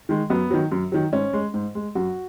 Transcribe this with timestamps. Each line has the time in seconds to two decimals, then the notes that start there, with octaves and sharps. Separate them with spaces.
0.09 D#3 G#3
0.30 F#2 B3
0.51 D#3 F#3
0.72 F#2
0.92 D#3 F#3
1.12 G#2 C#4
1.33 G#3
1.54 G#2
1.75 G#3
1.95 F#2 F#4